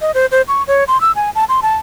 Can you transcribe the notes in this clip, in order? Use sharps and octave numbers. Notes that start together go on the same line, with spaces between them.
D#5
C5
C5
C#6
C#5
C6
E6
G#5
A5
C6
A5